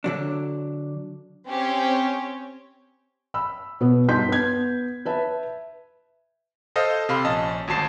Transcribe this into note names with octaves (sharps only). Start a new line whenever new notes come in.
D3 F#3 D4
C4 C#4 G4 C#5
B5 E6
B2 B3
G2 D#4 A5 C6 G6 B6
B3 G#6
B4 E5 A5
A4 C5 D#5 F5
C3 F5 B5 C6
A#1 C#4 D#5 A5
G#1 D2 F#4 A5 C7 E7